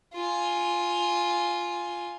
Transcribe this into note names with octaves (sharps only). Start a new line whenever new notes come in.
F4 G#5